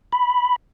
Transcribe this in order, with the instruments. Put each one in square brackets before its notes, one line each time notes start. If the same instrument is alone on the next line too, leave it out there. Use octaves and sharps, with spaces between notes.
[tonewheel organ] B5